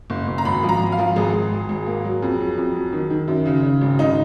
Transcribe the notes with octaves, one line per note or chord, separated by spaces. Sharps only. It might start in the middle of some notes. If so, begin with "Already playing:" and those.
F#1
F#1
A#5
G#1 B5
F3
A#5
G#1
F5
F3
G#1 G#4
G#1
G#1
G#1
A#3
F#3
F2
F#3
F2
F#3
D#3
D#3
F#2
C#3
C#3
G#1
C#3 D#4